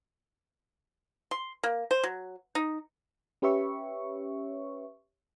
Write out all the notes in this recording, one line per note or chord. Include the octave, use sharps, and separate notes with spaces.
C6
A#3
C5
F#3
D#4
C#4 G4 B4 C#5 E5 C#6